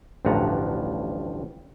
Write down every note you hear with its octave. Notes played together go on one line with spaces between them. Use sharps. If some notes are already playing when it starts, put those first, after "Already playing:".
A1 D2 G2 F3 F#5 A#5